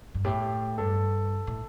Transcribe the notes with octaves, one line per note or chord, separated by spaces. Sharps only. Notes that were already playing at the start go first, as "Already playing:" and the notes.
G2
A2 G4
G2 A4
A2